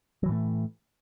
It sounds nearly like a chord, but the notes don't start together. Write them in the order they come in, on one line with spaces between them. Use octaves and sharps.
F#3 E3 A2 A3